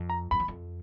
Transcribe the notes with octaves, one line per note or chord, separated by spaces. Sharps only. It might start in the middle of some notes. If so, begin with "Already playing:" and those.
Already playing: F2
A#5
F2 B5
E2
F2